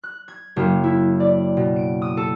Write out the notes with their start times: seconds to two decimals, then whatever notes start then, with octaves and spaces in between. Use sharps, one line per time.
0.04 F#6
0.28 G#6
0.56 F#1
0.84 E4
1.20 D5
1.57 B2
1.76 D7
2.02 D#6
2.17 A4